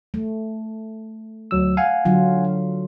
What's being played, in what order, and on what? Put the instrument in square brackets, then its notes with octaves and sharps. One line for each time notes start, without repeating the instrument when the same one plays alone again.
[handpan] A3
[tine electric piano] D2 F#3 E6
F5 F#5 G#5
[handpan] D3 F#3 F4